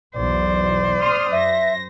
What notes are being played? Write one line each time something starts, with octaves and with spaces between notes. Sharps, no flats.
B1 E2 C5 D5
C6 D#6 F6
F#2 E5 A#6